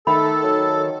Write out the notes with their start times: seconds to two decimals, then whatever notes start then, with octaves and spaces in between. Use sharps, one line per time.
0.07 D#3 A3 A4 B5
0.43 F#3